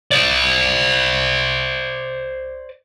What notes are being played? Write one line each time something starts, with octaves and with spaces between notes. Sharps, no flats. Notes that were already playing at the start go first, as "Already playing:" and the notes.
C5 D5